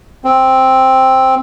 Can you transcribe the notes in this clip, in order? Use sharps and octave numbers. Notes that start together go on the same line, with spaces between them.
C4